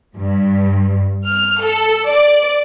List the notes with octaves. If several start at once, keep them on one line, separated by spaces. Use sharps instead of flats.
G2
F6
A4
D5